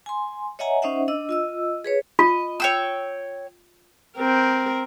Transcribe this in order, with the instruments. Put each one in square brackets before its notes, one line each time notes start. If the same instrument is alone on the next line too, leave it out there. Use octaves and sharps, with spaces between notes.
[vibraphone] G#5 C6
C#5 D#5 E5 F#5 G#5 A#5
C#4 D#4 C5 D#5 E5 F#5
D4 D#5 E6
F4 D#5 E6
G#4 B4 C#5
[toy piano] F4 [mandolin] D#5
[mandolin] C#5 G5 E6
[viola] C4 A#4